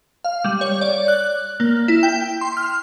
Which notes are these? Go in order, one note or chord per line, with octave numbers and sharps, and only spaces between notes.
F5
G3
C#5
D5
F#6
A#3
E4
G5
C6
F6